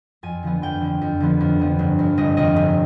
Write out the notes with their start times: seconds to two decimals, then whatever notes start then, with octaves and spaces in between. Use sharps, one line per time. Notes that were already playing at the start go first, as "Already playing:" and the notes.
0.23 F2 G#5
0.43 D3 F3 B3
0.62 F2 G5
0.81 D3 F3 B3
1.02 F2
1.20 D3 F3 B3
1.41 F2
1.59 D3 F3 B3
1.79 G1
1.99 F2 C3
2.18 G1 D#5
2.37 F2 C3 D#5
2.56 G1